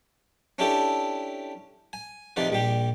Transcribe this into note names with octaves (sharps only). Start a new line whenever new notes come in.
C#4 D4 E4 G4 A4
G#5
C3 F3 D#4 B4 D5
A#1 G3 G4